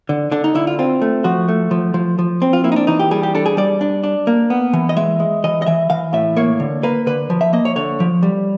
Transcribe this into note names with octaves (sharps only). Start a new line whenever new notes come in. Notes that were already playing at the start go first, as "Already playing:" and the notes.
D3
D3 D4
D#4
D3 E4
F4
C4 F4
A3
F3 F#4
A3
F3
F3
F3
C4
F4
A#3 E4
D#4
D4
E3 D#4
G4
G3 G#4
G4
D4 A4
G#4
G3 D5
D4
D4
A#3
B3
E3
D#5
G#3 E5
G#3
E3 D#5
D#5
E3 E5
E3 F5
A2 E5
A#3 C#5
D3
A#3 B4
D3 B4
F3
E5
A#3 D#5
C#5
D3 C#5
F3
G3